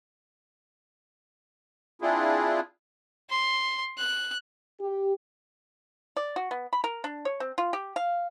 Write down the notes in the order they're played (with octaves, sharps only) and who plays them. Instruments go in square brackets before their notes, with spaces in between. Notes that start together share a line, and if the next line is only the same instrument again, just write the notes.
[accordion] C4 D4 E4 F4 G#4
[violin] C6
F#6
[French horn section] G4
[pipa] D5
F#4
B3
B5
A#4
D4
C#5
C4
F4
G4
F5